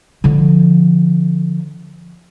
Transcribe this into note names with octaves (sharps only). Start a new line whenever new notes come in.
D3 F3